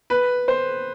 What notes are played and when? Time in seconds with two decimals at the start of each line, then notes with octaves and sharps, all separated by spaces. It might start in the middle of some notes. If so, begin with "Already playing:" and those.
0.10 B4
0.48 C5